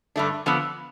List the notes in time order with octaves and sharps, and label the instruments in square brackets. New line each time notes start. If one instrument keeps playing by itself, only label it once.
[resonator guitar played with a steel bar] G2 D3 A3 D4
D3 F3 B3